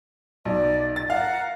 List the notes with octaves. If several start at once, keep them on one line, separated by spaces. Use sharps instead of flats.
B1 D5
A6
A#4 F5 F#5